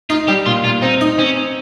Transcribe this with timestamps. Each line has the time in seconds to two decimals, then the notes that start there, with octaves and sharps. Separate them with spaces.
0.10 D#4 F4
0.28 G3 G4
0.46 A#2 F4
0.64 A#2 F4
0.82 C4 D#4
1.01 D#4
1.18 C4 C#4
1.36 C4